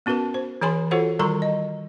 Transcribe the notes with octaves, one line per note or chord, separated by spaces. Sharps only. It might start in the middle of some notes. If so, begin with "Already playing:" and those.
B3 C#4 F#4 A#4 B4 A5
C5
E3 G#4 C#5 G#5 B5 C6
F4 F#4 A4 C5 C#5 F#5
D#3 G3 A#4 A#5 C6 C#6
D#5